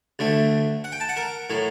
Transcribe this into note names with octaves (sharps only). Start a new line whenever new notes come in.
D2 D3 A3
F#5
G5
A5
F#5
A#4
A2 F#3